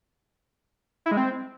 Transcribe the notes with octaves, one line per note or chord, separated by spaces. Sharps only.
E4
G#3
C4